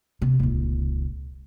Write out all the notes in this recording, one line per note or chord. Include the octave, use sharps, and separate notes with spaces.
C3
D#1 C#2